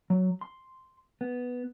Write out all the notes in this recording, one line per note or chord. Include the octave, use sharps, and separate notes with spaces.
F#3
C6
B3